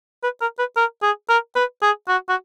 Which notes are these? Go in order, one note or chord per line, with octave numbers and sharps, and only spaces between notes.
B4
A#4
B4
A#4
G#4
A#4
B4
G#4
F#4
F#4